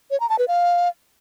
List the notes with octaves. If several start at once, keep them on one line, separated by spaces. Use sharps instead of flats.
C#5
A#5
A5
B4
F5